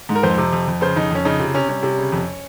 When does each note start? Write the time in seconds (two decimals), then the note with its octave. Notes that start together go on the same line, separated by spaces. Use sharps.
0.09 G#2
0.15 A#4
0.23 F2 C5
0.38 C3
0.53 F2
0.67 F2
0.81 C#3 C5
0.96 F2 D#4
1.11 F2 C#4
1.25 C#3 D#4
1.40 C3 F4
1.54 C3 C#4
1.69 G3 C#4
1.83 C3
1.98 C#3
2.12 F2